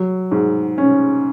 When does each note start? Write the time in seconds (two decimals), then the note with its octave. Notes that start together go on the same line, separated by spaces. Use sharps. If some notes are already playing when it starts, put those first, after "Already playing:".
Already playing: F#3
0.31 G#2
0.78 C#4